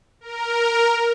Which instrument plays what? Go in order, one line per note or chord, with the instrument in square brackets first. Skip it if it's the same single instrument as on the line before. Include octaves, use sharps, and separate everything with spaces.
[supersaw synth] A#4